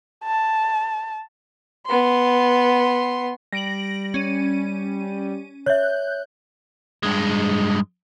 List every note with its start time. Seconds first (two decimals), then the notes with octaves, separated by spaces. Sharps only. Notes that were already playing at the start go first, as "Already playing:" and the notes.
0.24 A5
1.86 B3 C6
3.52 G3 A#6 D7 F#7
4.14 C#4 D#7
5.66 C#5 E5 F#6 G6
7.03 G2 G#3